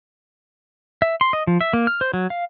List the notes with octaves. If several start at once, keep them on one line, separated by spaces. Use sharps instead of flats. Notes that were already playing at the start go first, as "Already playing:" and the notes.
E5
C6
D#5
F3
E5
A#3
F6
C5
F#3
F5